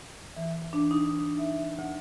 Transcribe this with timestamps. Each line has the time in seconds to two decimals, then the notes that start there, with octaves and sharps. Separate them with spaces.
0.37 E3
0.73 D4
0.91 D#4
1.38 E5
1.79 D2